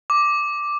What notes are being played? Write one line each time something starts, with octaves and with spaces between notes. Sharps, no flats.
D6